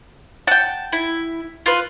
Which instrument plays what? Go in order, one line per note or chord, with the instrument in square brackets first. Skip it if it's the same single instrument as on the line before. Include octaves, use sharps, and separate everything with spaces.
[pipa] F#5 G5 [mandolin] A5
[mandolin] E4
F4 B4